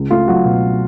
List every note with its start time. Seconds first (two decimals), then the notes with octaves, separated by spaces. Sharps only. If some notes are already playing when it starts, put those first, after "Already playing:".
Already playing: C#2
0.10 A3 F4
0.28 F#3 F#4
0.45 B2